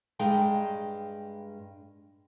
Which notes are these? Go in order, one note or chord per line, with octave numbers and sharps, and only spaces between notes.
G2 G#3 G5 A#5